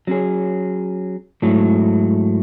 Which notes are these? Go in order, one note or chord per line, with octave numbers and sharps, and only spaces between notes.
F#3 C#4 G#4
G#2 F#3 A3 E4